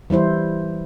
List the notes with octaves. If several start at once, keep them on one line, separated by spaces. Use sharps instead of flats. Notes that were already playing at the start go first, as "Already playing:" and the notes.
E3 G3 E4 C5